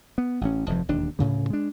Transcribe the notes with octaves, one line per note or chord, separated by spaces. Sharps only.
B3
A1 C#4
F1 F2 G#2 F3
E1 D#2 D4
D2 A2 C#3 G3
G#3 D4